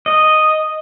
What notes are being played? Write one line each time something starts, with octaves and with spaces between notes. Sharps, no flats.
D#5